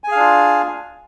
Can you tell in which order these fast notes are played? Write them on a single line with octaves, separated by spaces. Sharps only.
G#5 G#4 F5 D4 F4